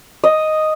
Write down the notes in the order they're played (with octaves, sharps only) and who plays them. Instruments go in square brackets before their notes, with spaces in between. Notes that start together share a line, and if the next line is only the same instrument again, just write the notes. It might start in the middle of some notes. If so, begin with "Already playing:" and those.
[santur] D#5